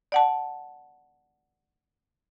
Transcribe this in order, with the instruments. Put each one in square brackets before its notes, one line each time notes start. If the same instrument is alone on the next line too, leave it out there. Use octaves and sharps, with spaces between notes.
[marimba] D5 F#5 A5